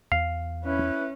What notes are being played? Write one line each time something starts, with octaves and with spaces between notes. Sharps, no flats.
E2 F5
C#4 E4 B4